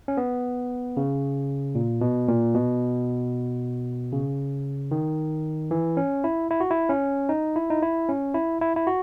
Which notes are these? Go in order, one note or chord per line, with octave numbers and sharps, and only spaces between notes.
C#4
B3
C#3
A#2
B2
A#2
B2
C#3
D#3
E3
C#4
E4
E4
F#4
E4
C#4
D#4
E4
D#4
E4
C#4
E4
E4
E4
F#4